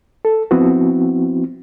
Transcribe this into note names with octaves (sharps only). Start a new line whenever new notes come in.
A4
F3 B3 C4 E4 F#4